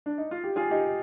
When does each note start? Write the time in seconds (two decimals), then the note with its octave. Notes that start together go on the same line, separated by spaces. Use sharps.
0.06 D4
0.18 D#4
0.31 F4
0.44 G4
0.56 F4 G#4
0.70 D#4 G4